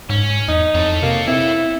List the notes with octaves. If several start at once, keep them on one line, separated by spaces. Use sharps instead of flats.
G#2 C#4
E2 D#4
F2 A4 C#5
C3 A#3
C4 E4